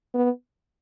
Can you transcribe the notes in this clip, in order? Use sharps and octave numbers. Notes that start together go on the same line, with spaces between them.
B3